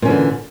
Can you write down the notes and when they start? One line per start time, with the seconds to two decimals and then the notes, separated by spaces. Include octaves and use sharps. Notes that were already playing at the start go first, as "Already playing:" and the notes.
0.02 A#2
0.05 C#4
0.08 E3
0.10 D3